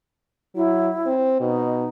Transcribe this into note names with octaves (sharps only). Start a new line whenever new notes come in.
F#3 E4
C4
B2 D#4